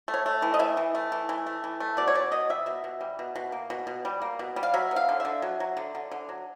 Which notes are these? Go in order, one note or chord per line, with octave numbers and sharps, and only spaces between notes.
A3
C#5
A3
E3
D#5
E3 E5
E3
A3
E3
E3
A3
E3
A3
B2 D5
C#5
B2 D5
B2 D#5
G3 E5
B2 E5
B2
G3
B2
B2
A#3
B2
B2
G3
A#3
B2
G3
F5
F#3 E5
B3
F5
D3
D3 E5
F#3
F#3
D3
D3
D3
F#3